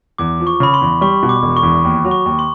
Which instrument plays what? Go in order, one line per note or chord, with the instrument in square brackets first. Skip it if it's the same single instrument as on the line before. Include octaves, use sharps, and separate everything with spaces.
[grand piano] E2 [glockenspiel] D6
[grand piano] F3
[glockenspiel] C#6
[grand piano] C#3 [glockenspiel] B5
[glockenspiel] C6
[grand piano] E2
[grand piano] G3 [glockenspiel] C#6
[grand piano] B2
[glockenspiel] D6
[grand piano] E1
[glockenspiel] C#6
[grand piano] E2
D#2
F#3
[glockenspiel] C#6
[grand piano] D#2
[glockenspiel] C6